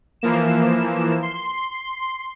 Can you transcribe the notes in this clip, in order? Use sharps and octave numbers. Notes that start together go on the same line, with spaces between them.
E3 F3 A#3 E7
C6